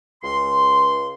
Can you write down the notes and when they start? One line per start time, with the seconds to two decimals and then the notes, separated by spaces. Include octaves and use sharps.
0.23 C#2 C6